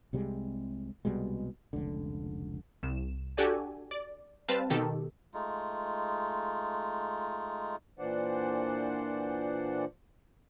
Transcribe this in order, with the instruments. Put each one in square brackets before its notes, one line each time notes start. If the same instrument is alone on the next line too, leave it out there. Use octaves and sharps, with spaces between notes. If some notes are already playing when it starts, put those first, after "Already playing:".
[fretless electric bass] C2 C3 G3 G#3
C2 B2 G3 G#3
F1 C#2 D3
[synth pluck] C2 E7
D4 F#4 G4 A4 D5 G#5
D5
G3 C4 B4 C5 F5 A5
B2 D#3 G4 A4
[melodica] G#3 A3 D#4 F4
[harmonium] A#2 E3 D4 C5 D5 F#5